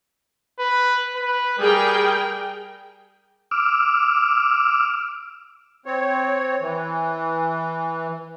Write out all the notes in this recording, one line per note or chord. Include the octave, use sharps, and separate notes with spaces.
B4
B4
G3 G#4 A#4 G5
D6 E6 F6
C4 C#5
E3